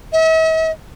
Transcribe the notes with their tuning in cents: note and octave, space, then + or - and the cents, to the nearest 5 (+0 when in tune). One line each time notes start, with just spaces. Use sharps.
E5 -45